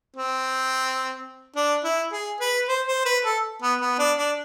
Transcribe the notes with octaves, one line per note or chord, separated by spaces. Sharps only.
C4
D4
E4
G#4
B4
C5
C5
B4
A4
B3
B3
D4
D4